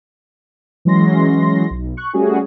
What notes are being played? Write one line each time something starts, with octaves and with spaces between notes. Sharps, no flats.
E3 F#3 G#3 C#4 C6 A#6
B1
C#6 F#6
G3 A3 C#4 F#4 G#4